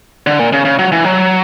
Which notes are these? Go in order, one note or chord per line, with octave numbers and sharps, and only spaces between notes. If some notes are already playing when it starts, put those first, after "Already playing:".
D3
A#2
C#3
C#3
F#3
E3
F#3